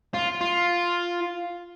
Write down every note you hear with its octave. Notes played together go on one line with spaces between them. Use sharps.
F4
F4